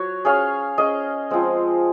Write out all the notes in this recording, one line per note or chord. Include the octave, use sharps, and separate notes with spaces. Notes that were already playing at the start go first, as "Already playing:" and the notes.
Already playing: F#3 F#4 C#5
C#4 G#4 C#5 F5
C#4 G#4 D#5
F3 G#3 C4